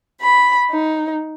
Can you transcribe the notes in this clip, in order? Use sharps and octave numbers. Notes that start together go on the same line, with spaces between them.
B5
D#4